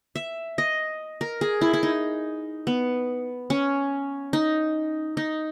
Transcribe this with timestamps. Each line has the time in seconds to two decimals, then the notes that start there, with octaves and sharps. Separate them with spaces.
0.15 E5
0.58 D#5
1.21 A#4
1.41 G#4
1.61 E4
1.73 E4
1.83 D#4
2.67 B3
3.50 C#4
4.33 D#4
5.17 D#4